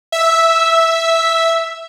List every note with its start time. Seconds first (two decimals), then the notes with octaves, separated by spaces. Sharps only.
0.12 E5 E6